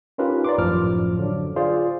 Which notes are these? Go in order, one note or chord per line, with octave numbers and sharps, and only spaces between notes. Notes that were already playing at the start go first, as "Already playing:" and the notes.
C#4 D#4 F4 G4 A#4 B4
D5 A#5 C6 D6
G#1 F#2 A2 F3 D6 F6
D3 F#3 D4
F4 G#4 C5 D5